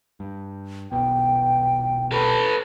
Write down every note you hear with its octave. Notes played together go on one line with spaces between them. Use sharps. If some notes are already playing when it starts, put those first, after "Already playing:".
G2
D#1 B1 B2 G5
A4 B4